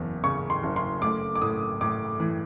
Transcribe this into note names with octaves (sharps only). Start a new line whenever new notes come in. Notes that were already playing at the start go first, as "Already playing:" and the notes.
Already playing: F#1 E2
C#3 C#6
C6
F#1
C6
A3 D6
D6
A2 D#6
A2 D6
E3